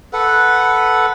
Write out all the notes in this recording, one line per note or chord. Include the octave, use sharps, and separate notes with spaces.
A4 B4 F#5